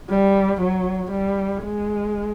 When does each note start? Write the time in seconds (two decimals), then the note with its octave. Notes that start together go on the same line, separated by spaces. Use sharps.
0.10 G3
0.61 F#3
1.11 G3
1.63 G#3